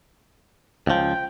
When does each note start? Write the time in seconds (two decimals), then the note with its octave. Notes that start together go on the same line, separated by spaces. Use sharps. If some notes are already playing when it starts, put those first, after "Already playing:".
0.87 C#2 F3 G5